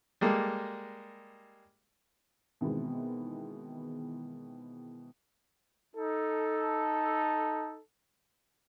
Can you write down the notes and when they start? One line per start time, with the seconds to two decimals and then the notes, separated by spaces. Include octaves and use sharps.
0.21 G3 G#3 A#3 A4
2.61 B2 D#3 E3 G#3 B3 C4
5.95 D#4 A4